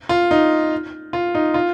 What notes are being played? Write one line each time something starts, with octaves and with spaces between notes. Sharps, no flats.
F4
D#4
F4
D#4
F4